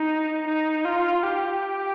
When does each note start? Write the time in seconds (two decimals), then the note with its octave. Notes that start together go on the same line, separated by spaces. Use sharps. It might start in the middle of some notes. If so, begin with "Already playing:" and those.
Already playing: D#4
0.47 D#4
0.85 F4
1.23 G4